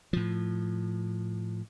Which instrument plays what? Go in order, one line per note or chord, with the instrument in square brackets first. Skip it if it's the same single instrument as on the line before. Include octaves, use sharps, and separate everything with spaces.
[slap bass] A2 F3